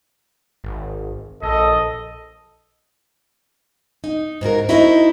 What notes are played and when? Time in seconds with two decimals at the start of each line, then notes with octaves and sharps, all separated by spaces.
0.64 G#1
1.42 A#1 A4 D#5
4.04 D#4
4.41 G#2 A#3 F#4 A#4
4.69 D#4 E4 F#4 C5 D#5 E5